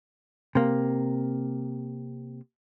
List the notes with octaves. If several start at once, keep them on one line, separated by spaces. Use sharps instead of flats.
C3 A#3